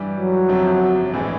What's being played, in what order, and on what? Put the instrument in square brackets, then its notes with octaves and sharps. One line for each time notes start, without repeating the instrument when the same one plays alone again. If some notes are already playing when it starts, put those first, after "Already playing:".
Already playing: [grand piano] G2 E3 G3
[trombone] F#3
[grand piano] G1 F2 C3 F3
A#1 A2 E3 G#3